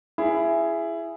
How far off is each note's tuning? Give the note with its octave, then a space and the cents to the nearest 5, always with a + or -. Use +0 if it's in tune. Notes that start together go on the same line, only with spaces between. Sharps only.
E4 +20 G#4 +0